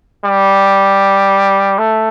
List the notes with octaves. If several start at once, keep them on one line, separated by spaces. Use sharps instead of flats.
G3
A3